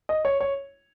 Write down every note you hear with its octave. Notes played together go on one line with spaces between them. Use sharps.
D#5
C#5
C#5